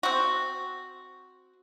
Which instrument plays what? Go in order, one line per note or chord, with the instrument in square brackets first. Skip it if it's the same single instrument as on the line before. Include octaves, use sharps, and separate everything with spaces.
[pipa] C4 F#4